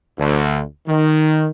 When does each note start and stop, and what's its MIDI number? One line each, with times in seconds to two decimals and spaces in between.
0.17 0.61 38
0.86 1.47 51